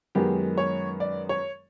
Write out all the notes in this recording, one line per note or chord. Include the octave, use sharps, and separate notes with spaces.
F#2 D#3 G#3 B3 G4
C#5
D5
C#5